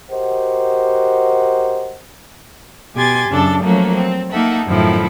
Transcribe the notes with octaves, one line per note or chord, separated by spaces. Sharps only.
F#4 G4 A#4 C5 D#5 F#5
B2 G4 G#5 C6 G#6 A6
F#2 C#3 D4 A4 A6
F3 F#3 A3 A#3 C#4
C4
A#3 D#4 A4 E5 F#5
F#2 A2 D#3 F3 E4